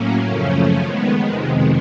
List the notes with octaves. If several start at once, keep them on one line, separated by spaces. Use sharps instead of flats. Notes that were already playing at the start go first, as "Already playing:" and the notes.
Already playing: A2 F#3 A#3 C#4
F#2 C#3 F3 A3 C#4
D#3 G#3 B3
F2 C3 D#3 G#3